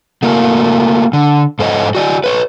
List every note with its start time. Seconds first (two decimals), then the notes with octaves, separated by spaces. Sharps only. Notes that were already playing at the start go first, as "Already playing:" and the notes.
0.23 A3 A#3 F#4 A#4
1.13 D3
1.59 G#2 A4 C5 C#5 D#5
1.95 F#4 D5 D#5
2.24 B4 C#5